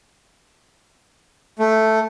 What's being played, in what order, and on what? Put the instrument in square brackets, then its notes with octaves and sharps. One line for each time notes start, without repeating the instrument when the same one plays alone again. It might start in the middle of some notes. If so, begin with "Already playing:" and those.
[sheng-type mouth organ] A3